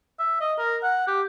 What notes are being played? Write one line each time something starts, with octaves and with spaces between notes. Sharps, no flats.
E5
D#5
A#4
F#5
G4